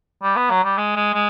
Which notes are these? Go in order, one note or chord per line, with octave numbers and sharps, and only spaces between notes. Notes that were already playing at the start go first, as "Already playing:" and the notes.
G3
B3
F#3
G3
G#3
G#3
G#3